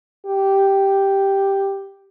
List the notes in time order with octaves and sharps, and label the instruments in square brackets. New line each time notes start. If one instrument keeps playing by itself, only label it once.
[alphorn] G4